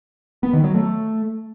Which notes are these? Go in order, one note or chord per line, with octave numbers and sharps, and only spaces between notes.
B3
D#3
F#3
A3